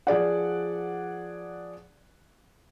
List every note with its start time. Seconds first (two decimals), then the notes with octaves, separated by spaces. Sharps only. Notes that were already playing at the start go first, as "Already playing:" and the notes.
0.07 F3 G#4 D5 F#5